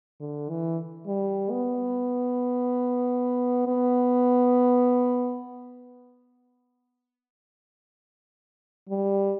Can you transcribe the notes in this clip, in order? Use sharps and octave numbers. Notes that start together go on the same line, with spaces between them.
D3
E3
G3
B3
B3
G3